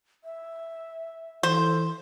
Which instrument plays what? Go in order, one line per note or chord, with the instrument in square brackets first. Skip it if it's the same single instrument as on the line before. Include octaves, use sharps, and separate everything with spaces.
[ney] E5
[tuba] E3 [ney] A4 [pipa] C5